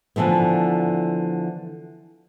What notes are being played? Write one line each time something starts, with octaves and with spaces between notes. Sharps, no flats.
D3 E3 F3 A3 B3